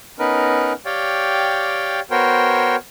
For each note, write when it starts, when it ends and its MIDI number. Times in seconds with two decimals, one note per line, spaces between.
0.19 0.73 59
0.19 0.73 61
0.19 0.73 63
0.19 0.73 70
0.19 0.73 71
0.85 2.00 67
0.85 2.00 73
0.85 2.00 74
0.85 2.00 77
0.85 2.00 79
2.11 2.76 59
2.11 2.76 66
2.11 2.76 70
2.11 2.76 72
2.11 2.76 73
2.11 2.76 79